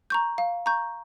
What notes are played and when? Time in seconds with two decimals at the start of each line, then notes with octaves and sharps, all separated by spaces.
0.10 A#5 C#6 G6
0.38 F5
0.66 A#5 C#6 G6